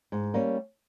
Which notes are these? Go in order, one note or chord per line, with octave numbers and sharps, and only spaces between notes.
G#2
G3 A#3 C#4